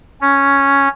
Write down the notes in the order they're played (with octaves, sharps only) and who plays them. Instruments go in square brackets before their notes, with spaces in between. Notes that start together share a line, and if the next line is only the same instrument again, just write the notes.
[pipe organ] C#4